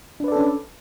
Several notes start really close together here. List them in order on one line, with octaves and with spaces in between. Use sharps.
D4 B4 D5 A4 C#4